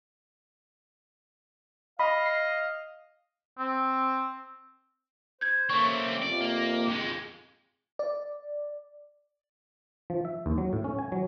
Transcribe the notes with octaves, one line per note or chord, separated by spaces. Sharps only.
D#5 F5 B5
C7
C4
C5 G6 G#6
A3 A#3 C4 C#4 D5 C#6
F2 C3 F3 D5
A#3
F2 G#3
D5
F3
E5
D#2
F#3
A2
C#4
G#5
F#3